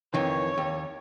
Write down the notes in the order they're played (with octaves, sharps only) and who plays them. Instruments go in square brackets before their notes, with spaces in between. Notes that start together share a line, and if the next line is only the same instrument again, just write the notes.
[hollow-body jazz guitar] F2 D#3 E3 [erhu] C#5
[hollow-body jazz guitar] D#2